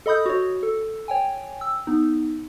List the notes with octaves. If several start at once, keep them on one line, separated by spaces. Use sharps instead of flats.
A4 D#5 B5 D#6 G6
F#4 C#5
A4
C#5 G5 G#5
E6
B3 D#4